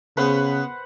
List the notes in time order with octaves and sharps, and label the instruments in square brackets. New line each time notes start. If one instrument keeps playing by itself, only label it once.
[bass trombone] C#3 [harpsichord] B3 C#4 G#4 [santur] B4 C5 F#5